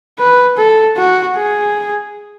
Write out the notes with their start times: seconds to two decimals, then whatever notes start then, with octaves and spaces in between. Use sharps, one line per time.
0.19 B4
0.58 A4
0.97 F#4
1.37 G#4